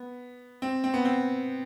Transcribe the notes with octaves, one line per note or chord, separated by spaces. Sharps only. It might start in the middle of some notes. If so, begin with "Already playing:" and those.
Already playing: B3
C4
C4
B3
C4